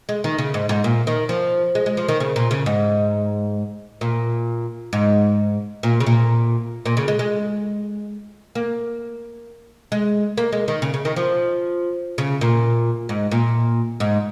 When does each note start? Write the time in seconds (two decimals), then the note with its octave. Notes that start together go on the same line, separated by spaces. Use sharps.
0.09 G#3
0.24 D#3
0.39 C#3
0.54 G#2
0.69 G#2
0.84 A#2
1.07 D#3
1.29 F3
1.75 G#3
1.86 G#3
1.97 F3
2.09 D#3
2.20 C#3
2.36 A#2
2.51 C#3
2.66 G#2
4.01 A#2
4.93 G#2
5.83 A#2
6.00 C#3
6.07 A#2
6.86 A#2
6.97 C#3
7.08 G#3
7.19 G#3
8.55 A#3
9.92 G#3
10.37 A#3
10.53 G#3
10.68 D#3
10.82 C#3
10.94 C#3
11.05 D#3
11.16 F3
12.18 C#3
12.41 A#2
13.09 G#2
13.32 A#2
14.00 G#2